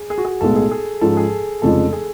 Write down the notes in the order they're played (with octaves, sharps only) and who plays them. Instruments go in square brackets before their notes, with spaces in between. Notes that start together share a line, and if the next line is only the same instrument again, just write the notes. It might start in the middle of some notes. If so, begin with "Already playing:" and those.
Already playing: [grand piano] G#4
G#4
F#4
G#4
[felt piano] B1 A2 G#3 B3 [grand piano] A4
[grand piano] G#4
G#4
[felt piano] G#2 F3 G#3 C#4 [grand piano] A4
[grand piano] G#4
[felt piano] F1 F2 C#3 F3 G#3 [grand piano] A4
[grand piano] G#4